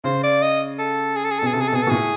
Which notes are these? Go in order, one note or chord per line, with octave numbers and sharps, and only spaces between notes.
C#3 C5
D5
D#5
A4
G#4
A4
G#4
A4
B2 G#4
C3 A4
G#4
A4
B2 G#4
A4
A#2
A2 G#4